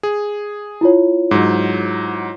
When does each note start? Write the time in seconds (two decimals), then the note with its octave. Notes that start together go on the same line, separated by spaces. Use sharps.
0.03 G#4
0.81 E4 F4 C#5
1.31 G#2 F#3